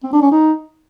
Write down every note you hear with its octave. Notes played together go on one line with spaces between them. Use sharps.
C4
D4
C#4
D#4